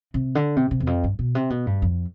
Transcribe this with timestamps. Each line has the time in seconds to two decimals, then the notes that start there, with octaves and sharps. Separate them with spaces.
0.14 C3
0.35 D3
0.56 C3
0.71 C3
0.80 E2
0.87 F2
1.04 G2
1.19 B2
1.35 C3
1.50 B2
1.67 G2
1.82 F2